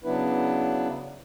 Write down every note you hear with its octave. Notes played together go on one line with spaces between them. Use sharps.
C#3 F#3 B3 D4 E4 B4